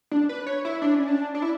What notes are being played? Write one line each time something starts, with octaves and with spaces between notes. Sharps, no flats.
D4
B4
C#5
E4
D4
C#4
D4
D4
E4